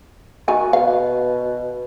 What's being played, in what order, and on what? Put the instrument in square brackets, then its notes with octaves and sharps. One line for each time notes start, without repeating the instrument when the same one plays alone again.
[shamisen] D#3 G#5 [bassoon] F#4
[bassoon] B2 [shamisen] F5